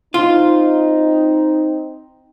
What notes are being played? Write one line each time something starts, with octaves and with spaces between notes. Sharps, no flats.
C4 D#4 F4